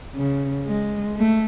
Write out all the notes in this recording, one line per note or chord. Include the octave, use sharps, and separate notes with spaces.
C#3
G#3
A3